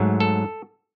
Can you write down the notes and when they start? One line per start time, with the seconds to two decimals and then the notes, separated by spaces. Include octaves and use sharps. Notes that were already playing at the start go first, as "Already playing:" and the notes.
Already playing: G#2 F#3 A3
0.20 A4